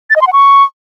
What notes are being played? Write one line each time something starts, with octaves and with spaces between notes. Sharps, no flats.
A6
D#5
C6
F#5
C#6